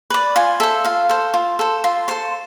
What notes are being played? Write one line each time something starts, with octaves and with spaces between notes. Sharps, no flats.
B4 D5
F4 G#5
A4 C5 E5
F4 F5
A4 C5
F4
A4 C5
F4 C6
A4 C5 C6